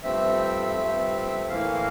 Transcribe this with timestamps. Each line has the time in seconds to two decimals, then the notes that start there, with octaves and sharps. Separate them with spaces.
0.03 G2 F3 A3 C4 E5
0.76 G2 F3 A3 C4
1.49 A2 E3 A#3 F5
1.74 F5